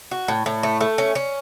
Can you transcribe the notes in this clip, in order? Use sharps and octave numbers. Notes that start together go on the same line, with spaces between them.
F#4
A2
A2
A3
A3
C#4
C#4